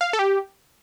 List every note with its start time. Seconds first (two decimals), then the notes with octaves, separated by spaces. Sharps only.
0.01 F5
0.13 A4
0.19 G4